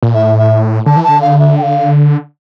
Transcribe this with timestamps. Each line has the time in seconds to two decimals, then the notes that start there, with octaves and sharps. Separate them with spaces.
0.03 A#2
0.14 A2 E5
0.38 E5
0.86 D3 A5
0.96 E3
1.04 D3 A5
1.22 F5
1.39 E5
1.58 G5
1.63 F5